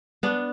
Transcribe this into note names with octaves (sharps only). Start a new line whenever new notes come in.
B3 D4